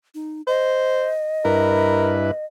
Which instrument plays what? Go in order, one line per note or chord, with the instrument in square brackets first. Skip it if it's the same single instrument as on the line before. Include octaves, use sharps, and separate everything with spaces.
[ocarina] D#4
[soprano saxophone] C5 [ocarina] D#5
[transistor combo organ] G2 E4 B4 [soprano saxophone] A#4